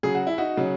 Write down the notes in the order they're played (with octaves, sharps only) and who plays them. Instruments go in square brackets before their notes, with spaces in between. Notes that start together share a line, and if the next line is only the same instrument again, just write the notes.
[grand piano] C#3 F#3 G#4
F#4
E4
D#4 F#4
C#3 F#3